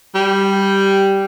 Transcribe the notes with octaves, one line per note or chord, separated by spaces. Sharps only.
G3